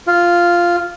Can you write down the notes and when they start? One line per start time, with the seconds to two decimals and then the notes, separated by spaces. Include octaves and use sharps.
0.07 F4